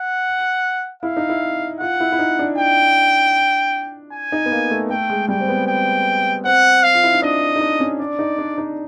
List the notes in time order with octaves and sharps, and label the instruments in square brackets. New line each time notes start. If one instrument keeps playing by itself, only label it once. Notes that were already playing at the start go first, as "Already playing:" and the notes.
Already playing: [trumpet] F#5
[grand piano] E4 [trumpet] F5
[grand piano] D#4
E4
[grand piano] F4 [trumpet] F#5
[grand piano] E4
E4
D#4
D4
[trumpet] G5
G#5
[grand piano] D#4
B3
A#3
A3
[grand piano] A3 [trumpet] G5
[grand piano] G#3
[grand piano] G3 [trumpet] G5
[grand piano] C4
B3
[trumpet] G5
[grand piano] C4 [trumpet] F#5
[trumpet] F5
[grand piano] F4
E4
D#4
[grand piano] D4 [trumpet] D#5
[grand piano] D#4
D4
C#4
[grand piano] D4 [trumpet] D5
[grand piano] D#4
D4
D#4